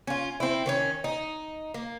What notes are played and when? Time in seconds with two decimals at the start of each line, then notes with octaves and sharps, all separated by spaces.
0.07 C#4 F4
0.40 C4 E4
0.66 D#3 C4 C#4
1.04 D#4
1.74 A#3